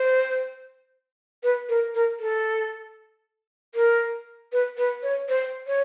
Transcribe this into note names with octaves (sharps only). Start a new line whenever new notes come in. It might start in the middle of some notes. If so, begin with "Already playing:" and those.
Already playing: C5
B4
A#4
A#4
A4
A#4
B4
B4
C#5
C5
C#5